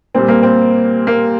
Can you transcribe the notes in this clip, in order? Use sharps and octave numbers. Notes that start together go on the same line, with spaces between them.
A#2 G3 C4
A#3
C4
A#3